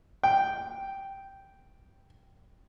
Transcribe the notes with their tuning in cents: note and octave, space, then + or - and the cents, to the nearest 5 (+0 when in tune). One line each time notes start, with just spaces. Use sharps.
G5 -5